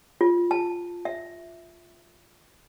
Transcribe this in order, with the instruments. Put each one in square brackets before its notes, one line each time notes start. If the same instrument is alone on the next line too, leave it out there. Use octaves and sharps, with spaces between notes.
[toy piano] F4
A5
E5